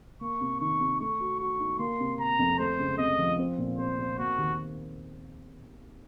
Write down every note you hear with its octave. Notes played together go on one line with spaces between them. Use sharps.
A#3 C#6
C3
D#3 C#6
C3
A3 C#6
F#4
F#4 C#6
D#4
A#3 C6
C3
A#3 A#5
F2
A3 C5
C#2
C3 D#5
F3
C4
A#2
C4 C5
C4
A#3 F#4
D#2